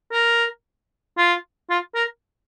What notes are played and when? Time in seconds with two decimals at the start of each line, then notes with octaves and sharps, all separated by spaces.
0.13 A#4
1.18 F4
1.70 F4
1.95 A#4